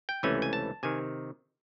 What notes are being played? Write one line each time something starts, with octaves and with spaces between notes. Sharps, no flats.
G5
C#2 C3 E3 A3 C#4 G#5
G#5
A5
C3 D#3 G#5